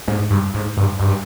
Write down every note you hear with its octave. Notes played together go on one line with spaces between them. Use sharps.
G#2
G2
G#2
G2
G2